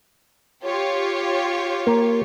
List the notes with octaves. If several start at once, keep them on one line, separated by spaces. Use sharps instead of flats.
F4 G4 C#5
A#3